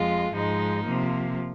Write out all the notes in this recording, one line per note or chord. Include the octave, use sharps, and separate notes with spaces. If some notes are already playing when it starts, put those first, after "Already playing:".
Already playing: F2 F3 G#3 F4
G#2 F3 G#3 D#4
C3 F3 A#3